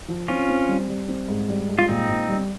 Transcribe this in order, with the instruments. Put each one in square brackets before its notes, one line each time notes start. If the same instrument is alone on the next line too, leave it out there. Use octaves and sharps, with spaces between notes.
[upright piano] F3
[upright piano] C4 [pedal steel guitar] C#4 F4
[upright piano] C4
G3
G3
C4
G#2
G3
G#2
[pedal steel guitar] F4
[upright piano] A#2 [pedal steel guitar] C4 D#4
[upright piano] A#2
G3